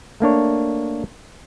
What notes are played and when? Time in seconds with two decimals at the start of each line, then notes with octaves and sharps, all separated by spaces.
0.20 A3 A#3 D4 C#5